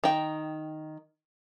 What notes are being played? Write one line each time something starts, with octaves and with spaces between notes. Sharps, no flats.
D#3 G5